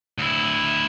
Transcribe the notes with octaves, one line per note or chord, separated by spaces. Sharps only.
D2 E4